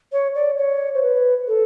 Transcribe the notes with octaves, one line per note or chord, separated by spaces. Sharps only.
C#5
D5
C#5
C5
B4
A4